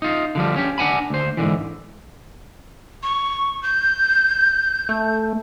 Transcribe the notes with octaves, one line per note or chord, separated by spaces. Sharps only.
D#4 F4
D3 F3 G3
C#4 G4
D4 F#5 G#5 B5
D2 C5
G#2 B2 D3 E3
C#6
G6
A3